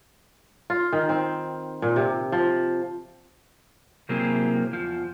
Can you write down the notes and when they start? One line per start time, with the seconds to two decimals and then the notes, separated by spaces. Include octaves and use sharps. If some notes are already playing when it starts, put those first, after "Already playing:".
0.70 F4
0.93 D#3
1.09 C4
1.82 A#2
1.96 C3
2.32 F3
4.09 C3 F#3 A#3 C4 E4 G#4
4.73 E2 F3